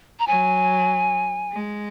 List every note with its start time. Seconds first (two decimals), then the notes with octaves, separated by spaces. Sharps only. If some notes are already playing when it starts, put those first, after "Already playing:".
0.20 A#5
0.27 F#3 G#5
1.52 G#3